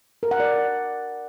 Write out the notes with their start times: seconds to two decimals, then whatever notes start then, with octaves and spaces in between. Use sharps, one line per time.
0.23 A#4
0.31 F#5
0.40 D5